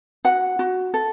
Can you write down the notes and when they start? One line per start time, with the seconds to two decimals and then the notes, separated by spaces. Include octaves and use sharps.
0.25 F#4 F#5
0.59 F#4
0.94 A4